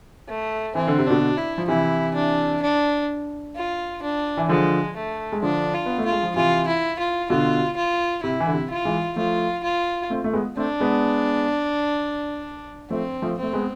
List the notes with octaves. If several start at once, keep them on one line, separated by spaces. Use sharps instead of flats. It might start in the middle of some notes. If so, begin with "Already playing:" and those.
A3
E3 C4
D3
C3
B2 D3 D4
E4
F3
C3 E3 E4
D4
D4
F4
D4
E3
D3 F3 G#3
A3
G#3
D3 F3 D4
F4
B3
A3
F4
G#3
F3
C3 E3 F4
E4
F4
B2 D3 F4
F4
C3 E4
E3
D3
C3
F4
E3 G#3
F3 A3 F4
F4
A3 C4
A3
G#3 B3
A3 C4 D4
G#3 B3
F3 A3 C4
F3 A3
A3 C4
G#3 B3